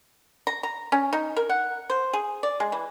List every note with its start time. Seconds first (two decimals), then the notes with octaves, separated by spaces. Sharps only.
0.47 A#5
0.63 A#5
0.92 C#4
1.13 D#4
1.36 A#4
1.49 F#5
1.90 C5
2.13 G#4
2.43 D5
2.60 G#3
2.72 E3